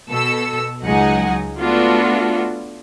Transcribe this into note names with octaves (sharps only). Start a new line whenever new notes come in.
B2 A4 E6
C#2 F#3 G#3 D#4 F#5 G#5
A3 B3 D4 F4 F#4 A4